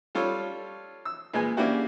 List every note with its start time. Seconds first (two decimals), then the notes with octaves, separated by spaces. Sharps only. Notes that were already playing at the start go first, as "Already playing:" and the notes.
0.15 G3 F4 A4 C#5
1.05 E6
1.34 A#2 G#3 B4 G#5
1.57 A#3 C#4 D4 E4 F#4 G4